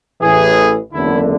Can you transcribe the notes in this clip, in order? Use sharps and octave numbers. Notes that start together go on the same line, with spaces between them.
A1 A2 E3 G#4
F#1 E2 D3 E4